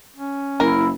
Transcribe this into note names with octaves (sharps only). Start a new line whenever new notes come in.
C#4
F#1 E4 A#4